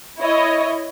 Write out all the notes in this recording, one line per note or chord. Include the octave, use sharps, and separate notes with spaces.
E4 C#5 D#5